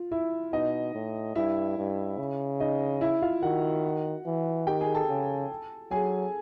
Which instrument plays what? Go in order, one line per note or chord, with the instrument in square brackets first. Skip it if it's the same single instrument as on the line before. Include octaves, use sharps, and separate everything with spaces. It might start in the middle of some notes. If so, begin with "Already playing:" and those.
Already playing: [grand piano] F4
E4 E5
[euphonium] B2 [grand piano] D#4 D#5
[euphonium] A2
[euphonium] G2 [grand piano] E4 E5
[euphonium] G2
C#3
[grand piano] D#4 D#5
E4 E5
F4 F5
[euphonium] D#3 [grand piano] F#4 F#5
[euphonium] E3
[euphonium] D#3 [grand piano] G4 G5
[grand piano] G#4 G#5
A4 A5
[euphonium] C#3
[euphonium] F#3 [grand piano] G#4 G#5